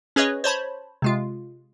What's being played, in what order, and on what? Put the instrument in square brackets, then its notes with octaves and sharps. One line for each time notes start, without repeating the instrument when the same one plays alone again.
[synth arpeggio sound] C#4 G#4 B4 C#5 D#5
C5 C#5 A5 B5
C3 G#3 F4